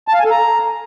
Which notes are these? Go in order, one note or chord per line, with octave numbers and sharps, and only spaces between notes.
A5
F5
G#5
A4
A#5